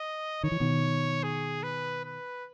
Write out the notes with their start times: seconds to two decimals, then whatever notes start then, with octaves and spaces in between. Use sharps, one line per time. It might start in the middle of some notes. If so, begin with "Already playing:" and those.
Already playing: D#5
0.43 D#3 C#5
0.52 E3
0.60 B2 D#3
1.23 G#4
1.63 B4
2.04 B4